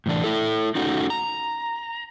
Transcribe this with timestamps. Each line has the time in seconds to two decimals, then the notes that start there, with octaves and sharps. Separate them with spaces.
0.06 A2 E3 D4
0.24 A3 E4 A4
0.75 C#4 D#4 F#4 A4
1.10 A#5